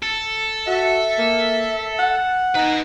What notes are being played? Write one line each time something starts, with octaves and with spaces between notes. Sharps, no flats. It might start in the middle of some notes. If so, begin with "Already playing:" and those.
A4
F#4 E5
A#3
F#5
D#4 B4 D#5